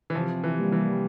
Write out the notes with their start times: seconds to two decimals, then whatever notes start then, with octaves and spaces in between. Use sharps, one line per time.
0.10 E3
0.15 C3 F3
0.44 E3
0.57 G3 A#3
0.72 E3